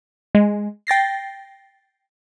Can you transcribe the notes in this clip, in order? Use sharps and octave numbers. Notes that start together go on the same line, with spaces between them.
G#3
G5 A6 A#6 C7